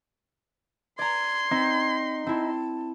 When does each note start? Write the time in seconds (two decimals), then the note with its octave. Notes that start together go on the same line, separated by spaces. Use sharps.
0.99 D5 A#5 C6 G#6
1.51 C4 D#4
2.26 C4 E4 A5